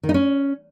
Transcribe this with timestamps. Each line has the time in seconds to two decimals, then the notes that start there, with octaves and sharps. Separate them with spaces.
0.03 D#3
0.09 D#4
0.14 C#4